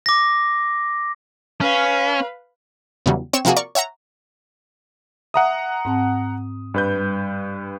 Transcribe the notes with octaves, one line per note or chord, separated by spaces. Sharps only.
D6 A#6
C#4 B4 F5
E2 C#3 F#3 G3
C4 C#5 C#6 E6 E7
C3 F3 A#3 F#4 G#4
A#4 D5 C#6
C#5 E5 F#5 A#5
E5 F#5 A#5 D#6
G#2 C4 A5
G2 B4 G6
G3